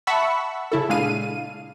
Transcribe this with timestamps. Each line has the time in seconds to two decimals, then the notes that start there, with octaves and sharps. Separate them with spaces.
0.07 E5 F#5 A5 B5 C#6 E6
0.72 C#3 E4 A4
0.89 A#2 C#3 G#3 D4 F5 D#7